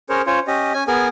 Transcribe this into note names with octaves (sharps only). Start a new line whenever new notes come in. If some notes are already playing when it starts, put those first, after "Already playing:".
C#4 G#4 A#4 C5 C#5
C#4 F4 C5 C#5
C#4 G4 D#5
C#4 G#5
B3 G#4 A#4 G#5